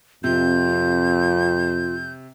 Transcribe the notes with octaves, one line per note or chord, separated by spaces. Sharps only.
F2 C3 F4 G6